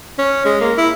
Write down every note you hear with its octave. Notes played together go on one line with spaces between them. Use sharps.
C#4
G#3
A#3
E4